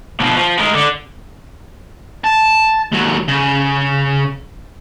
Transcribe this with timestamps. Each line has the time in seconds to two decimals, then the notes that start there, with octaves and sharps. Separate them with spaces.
0.20 B2 F3
0.36 F3
0.59 G#3 A#4
0.74 D3
2.24 A5
2.92 D#2 F#3
3.28 C#3